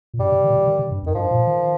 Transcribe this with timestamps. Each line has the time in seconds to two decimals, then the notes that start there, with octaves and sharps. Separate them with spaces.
0.14 A#2
0.19 G2 G3
0.32 C3
0.44 D#3
0.50 A#2
0.55 C3
0.67 D#3
0.79 C3
0.91 G2
1.03 F2
1.06 D#3
1.15 G2 F3
1.31 A#2
1.47 D#3